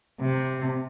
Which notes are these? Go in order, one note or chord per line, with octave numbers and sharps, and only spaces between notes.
C3